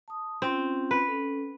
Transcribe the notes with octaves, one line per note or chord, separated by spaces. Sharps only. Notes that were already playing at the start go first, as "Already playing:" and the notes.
A5 D#6
C4 C#4 F4
B4
C#4 A4